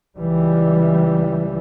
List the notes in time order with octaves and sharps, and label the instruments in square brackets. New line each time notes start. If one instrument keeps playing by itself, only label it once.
[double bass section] C#2 E3 G3